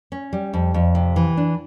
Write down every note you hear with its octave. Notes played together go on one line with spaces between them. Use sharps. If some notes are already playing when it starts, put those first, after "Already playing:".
C#4
G3
F2
F2
C3
E3
D4